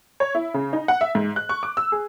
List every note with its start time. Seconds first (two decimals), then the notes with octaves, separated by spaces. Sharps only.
0.20 C#5
0.35 E4
0.54 C#3
0.73 D#4
0.88 F#5
1.01 E5
1.15 G#2
1.36 F#6
1.49 C#6
1.63 D6
1.77 E6
1.92 G#4